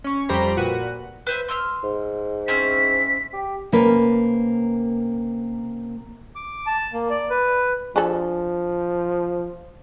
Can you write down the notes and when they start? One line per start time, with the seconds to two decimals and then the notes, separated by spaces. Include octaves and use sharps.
0.04 C#4 C#6
0.29 F2 G3 G4 C5 A#5 B5
0.57 A#2 F#4 B4 F#5 D#7
1.27 B4 C5 E5
1.48 C6 E6 F6
1.84 G#2
2.48 C4 C#4 E4 B6
3.33 G4
3.72 C3 A#3 C#4 B4
6.36 D6
6.66 A5
6.93 A#3
7.10 D5
7.30 B4
7.96 F3 D4 G#4 A4